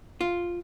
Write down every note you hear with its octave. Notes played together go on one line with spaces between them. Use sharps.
F4